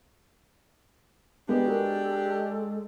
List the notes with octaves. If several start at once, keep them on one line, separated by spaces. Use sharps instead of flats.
G#3 B3 D4 G4
F#4 A4 A#4